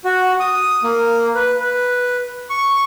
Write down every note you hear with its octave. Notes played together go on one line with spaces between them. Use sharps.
F#4
D#6
A#3
B4
B4
C#6